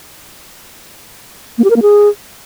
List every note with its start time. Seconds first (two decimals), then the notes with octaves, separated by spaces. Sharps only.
1.58 A#3
1.64 G4
1.70 A#4
1.76 A#3
1.82 G#4